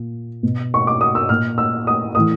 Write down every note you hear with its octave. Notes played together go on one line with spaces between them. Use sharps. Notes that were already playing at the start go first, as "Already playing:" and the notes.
Already playing: A#2
B2
C#6
D6
D#6
E6
A#2 F6
E6
D#6
A2 E3 D#6